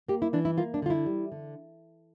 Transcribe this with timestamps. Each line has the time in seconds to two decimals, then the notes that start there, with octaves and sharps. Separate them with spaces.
0.08 A#3 G4
0.22 E4
0.33 E3 D4
0.45 E4
0.58 A#3 F4
0.74 D4
0.82 D3 F4
0.90 E4
1.06 G3
1.32 D3